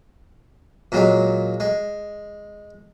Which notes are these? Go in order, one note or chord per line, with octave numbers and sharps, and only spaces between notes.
A#2 F#3 G#3
G#3